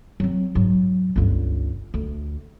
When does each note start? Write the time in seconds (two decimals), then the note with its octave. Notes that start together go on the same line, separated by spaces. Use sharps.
0.20 F#3 C4
0.55 G#2 F#3
1.16 G1 C#2
1.94 D2